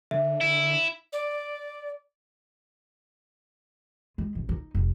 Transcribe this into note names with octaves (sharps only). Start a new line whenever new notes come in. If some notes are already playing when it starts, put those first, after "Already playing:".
D3 E5
E4
D5
G#3
A1
D#4
F1